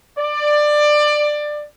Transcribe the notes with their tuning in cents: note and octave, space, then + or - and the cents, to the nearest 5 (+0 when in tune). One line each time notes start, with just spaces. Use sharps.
D5 +20